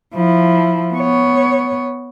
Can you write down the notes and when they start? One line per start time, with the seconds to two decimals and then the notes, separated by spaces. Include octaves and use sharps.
0.15 F3 E4
0.94 B3 C#5